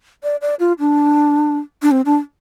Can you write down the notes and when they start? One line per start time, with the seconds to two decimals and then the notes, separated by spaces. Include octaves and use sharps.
0.23 D5
0.42 D5
0.60 F4
0.79 D4
1.82 D4
1.91 C4
2.05 D4